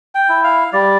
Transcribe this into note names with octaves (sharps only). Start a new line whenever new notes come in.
G5
E4
F5
G3 D5